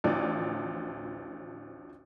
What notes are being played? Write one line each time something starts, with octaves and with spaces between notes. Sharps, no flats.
A1 D2 E3 F3 D5